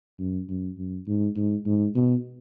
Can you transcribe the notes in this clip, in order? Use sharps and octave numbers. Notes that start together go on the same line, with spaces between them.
F#2
F#2
F#2
G#2
G#2
G#2
B2